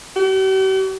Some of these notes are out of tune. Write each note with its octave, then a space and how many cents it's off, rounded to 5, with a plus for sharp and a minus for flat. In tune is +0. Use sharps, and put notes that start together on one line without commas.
G4 -45